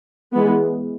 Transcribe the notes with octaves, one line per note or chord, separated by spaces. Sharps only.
E3 G#3 B3